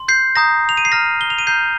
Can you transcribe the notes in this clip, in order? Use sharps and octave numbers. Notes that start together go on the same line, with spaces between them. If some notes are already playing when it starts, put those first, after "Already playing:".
Already playing: C6
G6 C7
A#5 D#6 G6 A#6
F7
D#7
C7
A#5 F6 A#6
G7
F7
D#7
A#5 F6 G6 C7